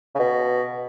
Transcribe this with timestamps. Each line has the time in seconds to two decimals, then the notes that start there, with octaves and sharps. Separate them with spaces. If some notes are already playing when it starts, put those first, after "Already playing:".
0.15 C#3
0.19 B2